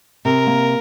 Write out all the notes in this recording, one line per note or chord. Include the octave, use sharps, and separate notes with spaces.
C3 A#4
A#3